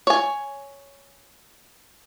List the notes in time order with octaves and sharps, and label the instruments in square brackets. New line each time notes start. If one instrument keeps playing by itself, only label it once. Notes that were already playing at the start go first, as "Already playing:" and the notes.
[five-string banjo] C#5 G#5